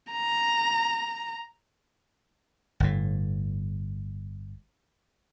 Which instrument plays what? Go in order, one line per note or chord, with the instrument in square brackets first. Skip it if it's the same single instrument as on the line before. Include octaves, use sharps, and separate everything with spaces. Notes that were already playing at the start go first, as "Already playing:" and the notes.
[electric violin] A#5
[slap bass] G1 A2